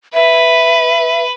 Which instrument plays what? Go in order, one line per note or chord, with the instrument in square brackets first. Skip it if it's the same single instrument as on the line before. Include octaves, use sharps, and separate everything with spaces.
[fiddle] B4 [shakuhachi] E5